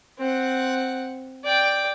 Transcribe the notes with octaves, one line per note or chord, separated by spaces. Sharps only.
C4 F#5
D5 G5